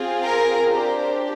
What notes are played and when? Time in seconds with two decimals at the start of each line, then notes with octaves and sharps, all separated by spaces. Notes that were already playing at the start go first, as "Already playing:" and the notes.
Already playing: C4 F4 G#4
0.23 A#4
0.72 D4 G4 C5